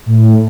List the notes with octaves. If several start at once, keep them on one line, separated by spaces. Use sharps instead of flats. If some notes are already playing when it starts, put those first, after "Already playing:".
A2